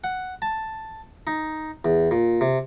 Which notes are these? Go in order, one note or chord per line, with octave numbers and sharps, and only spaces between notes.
F#5
A5
D#4
E2
A#2
C3